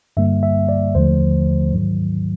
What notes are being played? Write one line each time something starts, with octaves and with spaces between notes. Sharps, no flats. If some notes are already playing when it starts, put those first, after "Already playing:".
G2 D3 G3 A#3 E5
E5
D5
D#2 D3 F3 A3 C5
G#2 D#3 F#3